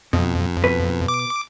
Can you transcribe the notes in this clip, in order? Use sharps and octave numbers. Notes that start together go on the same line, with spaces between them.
F2 B2
B2 B4
D6